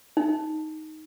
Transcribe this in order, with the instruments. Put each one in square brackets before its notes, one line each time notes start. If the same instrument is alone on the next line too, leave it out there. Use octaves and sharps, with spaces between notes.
[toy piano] D#4